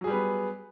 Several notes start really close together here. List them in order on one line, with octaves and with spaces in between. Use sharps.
F#3 G#4 G3 B4 B3